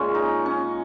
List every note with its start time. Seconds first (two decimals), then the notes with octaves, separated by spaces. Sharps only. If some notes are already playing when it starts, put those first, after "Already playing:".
Already playing: A#2 G#3 C#4
0.15 D#4
0.46 C#4